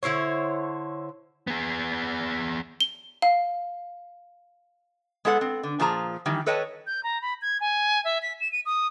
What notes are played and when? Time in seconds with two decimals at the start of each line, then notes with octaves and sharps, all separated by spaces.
0.03 D3 E4 C5 C#5
1.47 B3 G#4
2.81 G7
3.22 F5
5.25 G#3 B3 A4 F#5
5.41 C4
5.63 D3
5.80 A#2 F3 G#4 A5 A#5
6.26 D#3 E3 G3
6.46 A4 B4 C#5 D#5 G5 A5
6.87 G6
7.04 A#5
7.22 B5
7.42 G#6
7.61 G#5
8.05 E5
8.22 B6
8.40 E7
8.52 D#7
8.66 D#6